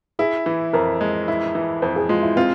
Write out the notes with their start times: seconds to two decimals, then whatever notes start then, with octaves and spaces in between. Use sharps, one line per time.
0.19 E4 G#4
0.46 E3
0.73 F2 A#4
1.01 G#3
1.28 E4
1.55 E3
1.82 F2 C5
1.96 G#4
2.09 G#3 F4
2.23 E4
2.36 C4 F4